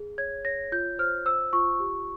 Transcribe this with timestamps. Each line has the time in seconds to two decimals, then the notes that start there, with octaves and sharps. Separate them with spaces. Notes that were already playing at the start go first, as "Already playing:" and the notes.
Already playing: G#4
0.18 C#5 G#6
0.45 C#5 A#6
0.72 F4 G6
0.99 C5 F6
1.26 C5 E6
1.53 F4 C#6
1.80 G4